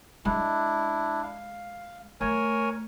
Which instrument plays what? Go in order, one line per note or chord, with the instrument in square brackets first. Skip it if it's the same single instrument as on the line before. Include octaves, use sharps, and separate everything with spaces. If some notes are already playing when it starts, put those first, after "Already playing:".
[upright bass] G#3 [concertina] D4 E4
[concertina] F5
[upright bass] A3 [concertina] A#4 C#5 G#5